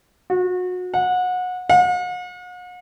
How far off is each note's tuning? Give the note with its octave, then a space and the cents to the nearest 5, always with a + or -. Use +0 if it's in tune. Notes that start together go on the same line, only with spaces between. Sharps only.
F#4 -30
F#5 -25
F#5 -45